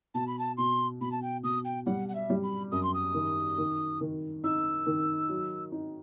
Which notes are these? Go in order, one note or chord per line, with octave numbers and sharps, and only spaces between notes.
B2 A5
B5
A5
B2 C6
B2 B5
A5
G5
B2 D#6
G5
G3 F#5
F#5
E5
G3
B5
F#2 D#6
C6
D#6
D#3
D#3
D#3
D#4 E6
D#3
F#3
D#4